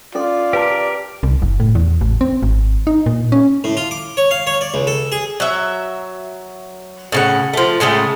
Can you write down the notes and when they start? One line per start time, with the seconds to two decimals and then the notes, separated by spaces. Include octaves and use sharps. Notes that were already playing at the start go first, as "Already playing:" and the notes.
0.15 C#4 F4 A4 D5
0.53 G4 A#4 B4 A5
1.23 C2
1.42 F#1
1.60 A2
1.75 E2
2.01 A1
2.21 C4
2.42 G#1
2.87 D#4
3.06 A#2
3.32 C#4
3.64 A2
3.77 F4
3.91 D6
4.17 C#5
4.31 F5
4.47 C#5
4.61 D5
4.74 C#2
4.87 A4
5.12 G#4
5.40 F#3 E5
7.12 A2 C#3 F#5
7.53 F3 A3
7.80 A2 C#3 G#3 A3